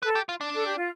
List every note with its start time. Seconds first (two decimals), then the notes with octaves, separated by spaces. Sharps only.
0.03 A4 B4
0.15 G4
0.29 F4
0.41 D4
0.54 A4
0.66 G4
0.77 F4